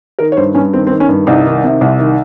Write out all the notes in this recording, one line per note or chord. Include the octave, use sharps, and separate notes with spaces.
D#3 A#4
C#5
G2 C5
G2 C#4
D#3 C4
C4
D#3
C#4
G2
C2 D#4
D#3
C3
C2
D#3